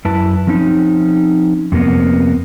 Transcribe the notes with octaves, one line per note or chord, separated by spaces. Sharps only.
F#2 E4 B4 A5
F3 C4 C#4 D#4
F2 C3 A#3 B3